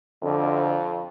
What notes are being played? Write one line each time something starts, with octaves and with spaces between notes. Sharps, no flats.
F2 D3